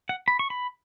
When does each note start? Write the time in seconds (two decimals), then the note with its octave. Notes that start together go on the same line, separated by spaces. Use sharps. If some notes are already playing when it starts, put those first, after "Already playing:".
0.09 F#5
0.28 B5
0.39 C#6
0.50 B5